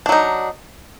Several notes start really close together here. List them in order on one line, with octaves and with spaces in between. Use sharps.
D4 F#3 D#4